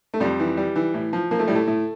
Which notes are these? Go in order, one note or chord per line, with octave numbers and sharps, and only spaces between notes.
A3
F2 G3
E3
G3
E3
A2
F3
F3 A#3
A3
A2 G3
A3
A2